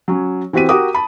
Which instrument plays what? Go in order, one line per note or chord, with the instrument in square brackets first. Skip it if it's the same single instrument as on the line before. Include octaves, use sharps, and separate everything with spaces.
[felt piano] F#3 C#4
E3 C4 F#4 G4 B6 D#7
F#4 G4 A#4 D6 D#6
A5 B5